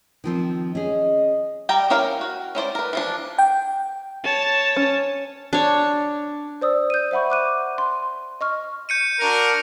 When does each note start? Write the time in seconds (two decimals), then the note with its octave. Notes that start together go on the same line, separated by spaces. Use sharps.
0.24 D#3 F3 C4
0.75 C#4 G#4 D#5
1.69 G3 G5 A#5
1.90 C#4 E4 A#4 F5 G5
2.21 F#4
2.55 C#4 E4 C5 D5
2.75 A#4 B4
2.93 E3 F3 D4
3.39 G5
4.24 C#5 A5
4.76 C#4
5.53 D4 C#5
6.61 C5 D5 D#6 E6
6.90 G6 D#7
7.11 C5 E5 F#5 B5 C#6
7.30 D6 F#6 D#7
7.78 C6
8.41 D#5 C#6 F6
8.89 G6 C#7 D#7
9.20 D4 F#4 A#4